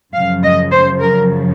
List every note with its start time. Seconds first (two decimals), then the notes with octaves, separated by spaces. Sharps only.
0.14 F#2 C#3 F3 F5
0.43 D#5
0.71 C5
1.00 A#4